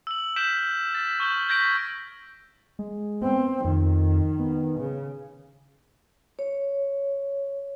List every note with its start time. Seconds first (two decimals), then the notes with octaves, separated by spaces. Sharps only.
0.07 E6 F#7
0.36 F6 G6 B6 D7 E7 F#7
0.95 A6 B6
1.20 C#6 F6 G6 E7 F#7 G7
1.49 G6 G#6 A#6 B6 D7 F#7
2.79 G#3
3.23 B3 C4
3.65 F2 D#3
4.39 B3
4.79 C#3
6.39 C#5